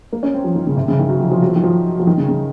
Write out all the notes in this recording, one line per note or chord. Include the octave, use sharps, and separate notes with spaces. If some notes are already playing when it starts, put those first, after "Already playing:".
A#3
C#4
C4
F3
D#3
C#3
C3
C#3
D#3
F#3
F3
F3
F#3
F3
D#3
F3
F3
D#3
C#3
C#3